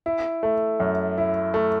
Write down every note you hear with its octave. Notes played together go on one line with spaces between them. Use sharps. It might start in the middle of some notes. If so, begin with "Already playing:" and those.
E4
A3
F#2
E4
A3